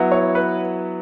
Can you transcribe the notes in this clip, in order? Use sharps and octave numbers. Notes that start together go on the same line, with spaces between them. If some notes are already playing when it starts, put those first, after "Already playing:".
Already playing: F#3 B3 E4
C#5
B4